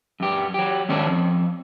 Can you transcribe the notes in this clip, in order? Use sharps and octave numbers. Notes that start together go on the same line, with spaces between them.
F#2 G4
F#3 G4
G#2 D#3 C#4 D4 C#5
F2